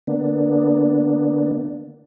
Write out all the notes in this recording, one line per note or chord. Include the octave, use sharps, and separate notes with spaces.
D3 A#3 B3 D4